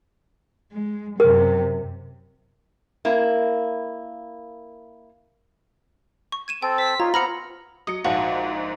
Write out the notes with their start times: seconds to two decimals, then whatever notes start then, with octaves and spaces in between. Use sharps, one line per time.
0.72 G#3
1.20 F#2 C3 A#4
3.05 A#3 E4
6.32 C#6
6.48 G#6 D#7 E7
6.62 C4 A4 G5
6.78 C5 B6
7.00 D#4 F4 C#5 A#5
7.14 B3 C4 A#5 B5 F6 C#7
7.87 F#3 D#5 D#6 C#7
8.04 A#1 G#2 F#4 F5 A5